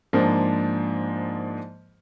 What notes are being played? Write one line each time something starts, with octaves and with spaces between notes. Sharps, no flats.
G#2 F3 A#3 D4